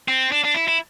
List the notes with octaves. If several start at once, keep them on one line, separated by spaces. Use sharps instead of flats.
C4
D4
D4
E4
E4